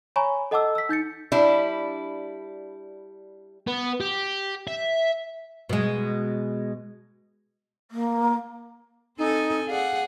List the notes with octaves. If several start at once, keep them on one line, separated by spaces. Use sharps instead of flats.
C#5 G#5 A#5 B5 C#6
A4 D#5 F#5 A5 D6 E6
E6 B6
D#4 G6 A6 C#7
G3 D4 E4
B3
G4
E5
B2 G#3
A#3
C4 D#4 A4 G#5
G#4 D5 F5 F#5